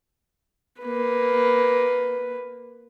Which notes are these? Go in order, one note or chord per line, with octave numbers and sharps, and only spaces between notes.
A#3 B4